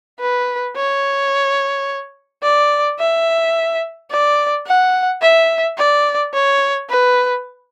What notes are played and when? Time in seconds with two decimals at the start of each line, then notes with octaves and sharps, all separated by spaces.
0.20 B4
0.76 C#5
2.43 D5
2.99 E5
4.10 D5
4.66 F#5
5.22 E5
5.78 D5
6.33 C#5
6.89 B4